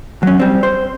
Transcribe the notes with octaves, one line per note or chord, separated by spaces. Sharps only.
F#3 C#4
G3 C4
C5